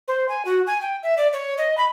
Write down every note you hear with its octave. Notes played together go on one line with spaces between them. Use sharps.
C5
G#5
F#4
G#5
G5
E5
D5
C#5
D#5
B5